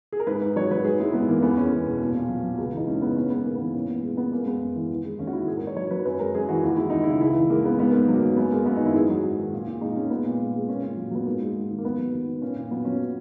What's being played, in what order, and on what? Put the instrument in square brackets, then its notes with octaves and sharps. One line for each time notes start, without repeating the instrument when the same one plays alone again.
[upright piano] G#4
A#4
G#2 B4
G#2
F#3 C#5
F#3 B4
G#2 G#4
G#3 E4
G#2 B3
E3 A#3
A#3
E2 B3
G#3 C#4
E2
B2
A#2
A#2
F#3
F#3
C#2
E3 D#4
G#3 C#4
C#3 B3
G#2 C#4
G#3 B3
G#2 A#3
E3 B3
A#2 C#4
A#2 B3
G#3
G#3 B3
F#2 A#3
G#3 B3
F#2
E3
D#2
G#3
D#2 C#4
F#4
D#3 E4
G#2 G#4
A#4
G#2 C#5
F#3 C#5
F#3 B4
F#2 B4
G#3 A#4
F#2 G#4
E3 F#4
D#2 F#4
G#3 E4
D#2 D#4
C#3 E4
C#2 E4
E3
G#3 A#3
C#3 B3
G#2 B3
G#2 A#3
F#3
A#3
F#3
F#2 B3
G#3 A#3
F#2 B3
D#4
D#3
E4
G#2 G#4
F#3 F#4
G#2
D#3
A#2
A#2
G#3 D#4
G#3 C#4
A#2 B3
A#2
G#3
G#3
A#2 C#4
A#2
F#3
F#3 B3
G#2 A#3
G#3
G#2
D#3
A#3
D#2 B3
F#3
D#2
D#3
A#2 C#4
A#2
F#3 B3
F#3 C#4